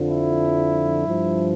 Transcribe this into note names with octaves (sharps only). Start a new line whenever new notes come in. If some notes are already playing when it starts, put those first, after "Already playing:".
Already playing: F2 D3 F3
E4
G2 F3